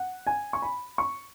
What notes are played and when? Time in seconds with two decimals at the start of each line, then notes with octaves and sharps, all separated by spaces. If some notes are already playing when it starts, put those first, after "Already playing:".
Already playing: F#5
0.27 G#5
0.53 C#6
0.62 B5
0.98 C#6